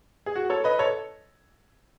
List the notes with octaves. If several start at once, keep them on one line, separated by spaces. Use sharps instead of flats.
G#4
F#4
A4 C#5
B4 D#5
A4 C#5